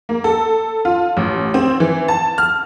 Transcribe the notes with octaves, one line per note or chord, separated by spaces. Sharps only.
A#3
A4
F4
A1
C4
E3
A5
F6